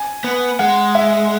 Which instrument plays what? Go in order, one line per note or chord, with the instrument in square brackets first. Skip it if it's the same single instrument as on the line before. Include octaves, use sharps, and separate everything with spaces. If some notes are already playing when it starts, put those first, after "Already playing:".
Already playing: [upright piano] G#5
[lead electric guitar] B3
[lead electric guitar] G#3 [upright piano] F#5
[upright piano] E5